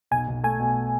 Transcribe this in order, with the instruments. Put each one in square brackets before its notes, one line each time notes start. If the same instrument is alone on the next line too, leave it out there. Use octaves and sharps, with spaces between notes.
[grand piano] B1 [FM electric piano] G#5
[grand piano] B1
[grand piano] A3 [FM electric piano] G#5
[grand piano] B2